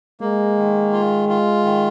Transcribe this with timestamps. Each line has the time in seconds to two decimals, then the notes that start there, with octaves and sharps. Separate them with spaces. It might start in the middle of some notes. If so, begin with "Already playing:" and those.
0.21 G#3 A#3
0.57 D#3
0.93 F4
1.29 F4
1.64 D#3